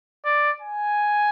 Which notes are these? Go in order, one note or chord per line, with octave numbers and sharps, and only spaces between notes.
D5
G#5